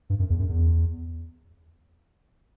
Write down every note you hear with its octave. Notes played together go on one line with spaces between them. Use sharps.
G2
F#2
E2
F#2
E2